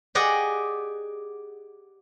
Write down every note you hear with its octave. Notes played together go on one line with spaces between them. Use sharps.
G4 G#4 D5 D#5 F#5